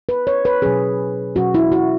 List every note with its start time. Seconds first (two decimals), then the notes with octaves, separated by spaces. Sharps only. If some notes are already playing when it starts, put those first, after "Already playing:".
0.09 B4
0.27 C#5
0.45 B4
0.62 B2 F#3 C#4 G#4
1.35 B2 F#3 C#4 F#4
1.54 E4
1.72 F#4